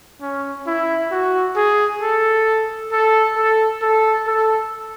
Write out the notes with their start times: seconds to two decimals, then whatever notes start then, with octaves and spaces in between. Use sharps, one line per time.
0.21 C#4
0.67 E4
1.12 F#4
1.56 G#4
2.01 A4
2.91 A4
3.37 A4
3.82 A4
4.27 A4